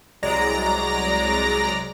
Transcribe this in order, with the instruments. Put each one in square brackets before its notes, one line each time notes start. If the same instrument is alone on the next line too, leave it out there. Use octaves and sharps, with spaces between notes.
[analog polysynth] C2 F#3 G#3 D5 A#5 A#6